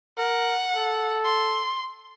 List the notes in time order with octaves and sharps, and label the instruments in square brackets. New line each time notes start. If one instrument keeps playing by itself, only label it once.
[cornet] A#4 [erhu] F#5
[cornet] A4
[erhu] C6